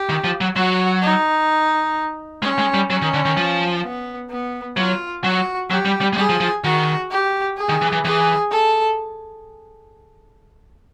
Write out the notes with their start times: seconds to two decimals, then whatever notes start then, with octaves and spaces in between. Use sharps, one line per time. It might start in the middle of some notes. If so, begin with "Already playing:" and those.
Already playing: G4
0.09 D#3
0.24 F3
0.41 F#3
0.55 F#3 F#4
1.02 D#4
2.42 G#3 C#4
2.59 G#3
2.74 G3
2.90 F#3 C#4
3.02 D#3
3.14 D3
3.25 D#3
3.37 F3
3.83 B3
4.30 B3
4.77 F#3 F4
5.24 F#3 F#4
5.70 F#3 G4
5.85 G3
6.01 G3
6.13 G#3
6.17 G3 G#4
6.29 F3
6.40 F3
6.64 D#3 F#4
7.11 G4
7.57 G#4
7.69 D#3
7.82 E3
7.92 E3
8.05 E3 G#4
8.51 A4